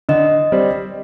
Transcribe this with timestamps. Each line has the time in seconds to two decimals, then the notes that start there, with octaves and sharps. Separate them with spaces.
0.09 D3 D#5
0.52 G3 C4